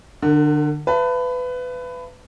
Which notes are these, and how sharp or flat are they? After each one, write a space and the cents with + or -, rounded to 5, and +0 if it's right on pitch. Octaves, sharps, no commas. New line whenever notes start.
D3 +25 A#4 -35
B4 +20 E5 +45 A5 +30